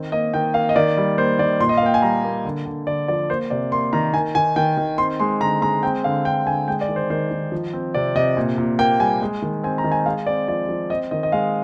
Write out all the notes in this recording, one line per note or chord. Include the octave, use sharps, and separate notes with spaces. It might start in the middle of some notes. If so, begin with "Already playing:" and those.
Already playing: D#3 C4
A#3 D#5
D#3 G5
A#3 F5
D#5
D#3 D5
G3
A#3 C5
D#3 D5
A#2 C6
D#5
F5
A#3 G5
G#5
G3 A#5
A#3
D3
D3
D3 D5
F3 D5
A#3 C5
C3 D5
A#3 C6
D#3 A#5
D#3 G#5
D#3 G#5
D#3 G5
D#3
C4 C6
G#3 C6
D3 A#5
G#3 A#5
C4 G5
D3 F5
D3 G5
D3 G#5
G#3 G5
D5
D#3
C5
D#3 C5
D#3
F3
C4
C3 D5
C3 D#5
A#2
A#2
A#3 G5
G3 G#5
G#3
D#3
C4 G#5
A#5
D#3
G#5
G#3 F5
C4 D5
F3 D5
F3
C4 D#5
D#3 D#5
D#5
G#3 F5